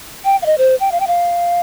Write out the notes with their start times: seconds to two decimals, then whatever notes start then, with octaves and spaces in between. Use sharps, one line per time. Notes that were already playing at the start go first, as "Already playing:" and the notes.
0.25 G5
0.42 F5
0.46 D#5
0.58 C5
0.80 G5
0.92 F5
1.00 G5
1.07 F5